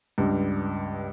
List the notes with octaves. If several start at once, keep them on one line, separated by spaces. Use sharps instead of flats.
C#2 G2